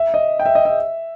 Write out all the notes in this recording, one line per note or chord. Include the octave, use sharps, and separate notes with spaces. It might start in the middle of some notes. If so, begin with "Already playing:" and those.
Already playing: E5
D#5
G5
E5
D#5
E5